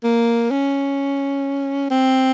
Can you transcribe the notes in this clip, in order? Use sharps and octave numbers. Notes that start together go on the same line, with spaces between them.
A#3
C#4
C4